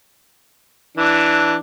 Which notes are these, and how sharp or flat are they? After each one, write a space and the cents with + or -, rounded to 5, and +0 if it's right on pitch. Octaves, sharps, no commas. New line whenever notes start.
E3 +0 D4 +0